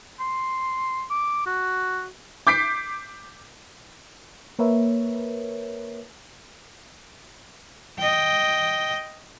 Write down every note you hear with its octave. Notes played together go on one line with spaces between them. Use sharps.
C6
D6
F#4
D6 G6 B6 C7 D7
A#3 A#4 B4 C#5 E5
D#5 G5